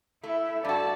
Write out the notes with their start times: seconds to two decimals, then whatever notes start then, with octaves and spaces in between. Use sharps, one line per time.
0.23 A3 E4 E5
0.65 G2 F#4 A4 D5 A5